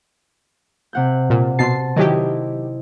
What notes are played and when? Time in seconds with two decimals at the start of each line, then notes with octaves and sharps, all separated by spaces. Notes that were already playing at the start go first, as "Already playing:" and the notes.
0.93 C3 F#5 G6
1.30 A#2
1.59 B2 A5 C6 C7
1.96 D#3 F#3 E4 G4 D#5